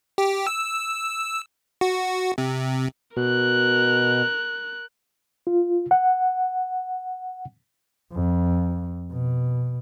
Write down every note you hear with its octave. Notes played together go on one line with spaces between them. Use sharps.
G4
E6
F#4
C3
B2 A#4 F#6
F4
F#5
F2
B2